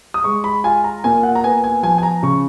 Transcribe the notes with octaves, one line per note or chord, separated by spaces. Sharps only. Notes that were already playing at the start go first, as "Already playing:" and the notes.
D#6
G#3 C#6
B5
F4 G#5
A#5
A#2 G#5
F#5
A#5
B3 G#5
G#5
F3 G#5
G#5
A#5
C#3 C#6